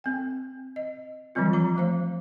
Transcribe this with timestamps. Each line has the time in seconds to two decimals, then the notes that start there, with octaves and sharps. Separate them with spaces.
0.04 C4 G5
0.76 D#5
1.35 D#3 E3 F#3 G3 C4 F4
1.53 F3 A#5
1.76 F3 A3 C5 F5